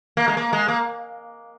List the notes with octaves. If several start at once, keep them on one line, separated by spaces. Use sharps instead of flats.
A#3
G#3
A#3
G#3
A#3